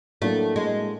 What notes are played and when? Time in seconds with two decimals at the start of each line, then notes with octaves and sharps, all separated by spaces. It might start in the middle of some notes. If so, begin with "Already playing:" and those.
0.22 A2 F#3 A3 A#3 D4
0.56 G#3